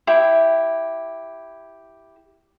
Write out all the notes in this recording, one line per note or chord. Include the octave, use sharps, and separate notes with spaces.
E4 G4